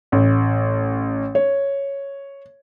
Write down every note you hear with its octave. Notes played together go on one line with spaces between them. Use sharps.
A1
C#5